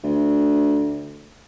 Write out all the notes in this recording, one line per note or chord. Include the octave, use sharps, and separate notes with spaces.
D2